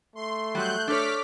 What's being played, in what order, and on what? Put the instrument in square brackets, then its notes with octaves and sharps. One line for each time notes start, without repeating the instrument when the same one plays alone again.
[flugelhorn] A3 [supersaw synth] C6
[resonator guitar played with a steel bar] F#3 G3 [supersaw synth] F#6 G6
[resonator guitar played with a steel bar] D4 A4 C#5 [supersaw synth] D6 F6 B6